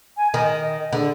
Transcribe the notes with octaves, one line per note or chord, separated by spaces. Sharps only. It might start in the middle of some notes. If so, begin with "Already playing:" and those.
G#5
D#3 D#5
D3 G#4